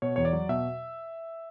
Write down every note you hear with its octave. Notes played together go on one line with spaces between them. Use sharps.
B2 C#5
E2 C#5
D5
F#3
B2 E5